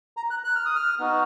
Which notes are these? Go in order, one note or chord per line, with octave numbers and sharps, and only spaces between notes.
A#5
F#6
F#6
F6
D#6
F6
B3 D#4 F#4